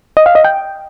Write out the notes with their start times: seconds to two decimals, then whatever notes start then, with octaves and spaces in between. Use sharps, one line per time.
0.17 D#5
0.26 F5
0.35 D#5
0.44 G5